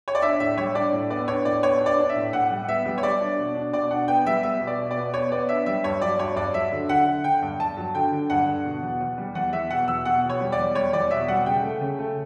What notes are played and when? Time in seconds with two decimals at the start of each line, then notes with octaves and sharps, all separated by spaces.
0.08 C#5
0.15 D5
0.22 D4 E5
0.40 A2 E5
0.57 G3 C#5
0.75 D4 D5
0.92 A2
1.10 B3 D5
1.28 D4 C#5
1.45 A2 D5
1.63 B3 C#5
1.81 D4
1.86 D5
1.98 D4
2.09 E5
2.16 A2
2.33 A2 F#5
2.50 G3
2.68 B3 E5
2.85 G3
2.98 C#5
3.03 G3 D5
3.20 D4
3.39 B2
3.55 D4
3.73 B2 D5
3.91 D4 F#5
4.08 B3 G5
4.26 G3 E5
4.43 B3 E5
4.61 B2
4.67 D5
4.79 B2
4.91 D5
4.97 B3
5.14 B3 C#5
5.32 B3 D5
5.49 D4 E5
5.66 G3 E5
5.84 G2 C#5
6.01 F#3 D5
6.19 G2 C#5
6.36 G2 D5
6.54 F#3 E5
6.72 D3
6.89 D3 F#5
7.07 D3
7.24 D3 G5
7.42 G2
7.60 G2 A5
7.77 F#3
7.95 D3 G5
8.12 D3
8.30 G2 F#5
8.47 D3
8.65 B2
8.83 E2
9.00 E2
9.18 G3
9.35 E2 F#5
9.53 E2 E5
9.70 B2 F#5
9.88 E2 E6
10.05 B2 F#5
10.23 E2
10.29 C#5
10.40 G3
10.52 D5
10.58 E2
10.75 G3 C#5
10.93 E2 D5
11.11 B2 E5
11.28 G3 F#5
11.46 C#3 G5
11.63 A3
11.81 C#3
11.99 A3